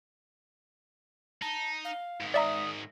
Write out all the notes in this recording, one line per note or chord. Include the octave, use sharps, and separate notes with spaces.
D#4 A5
F5
G#2 D#3
D5 E5 A#5 D#6